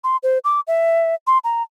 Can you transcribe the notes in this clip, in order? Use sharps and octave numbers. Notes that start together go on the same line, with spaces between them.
C6
C5
D6
E5
C6
A#5